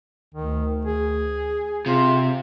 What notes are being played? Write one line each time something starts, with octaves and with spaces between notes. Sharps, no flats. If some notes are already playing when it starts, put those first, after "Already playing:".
D2 D#3
G#4
C3 F4